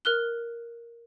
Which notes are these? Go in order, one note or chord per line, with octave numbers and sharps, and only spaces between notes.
A#4 F6 F#6 G7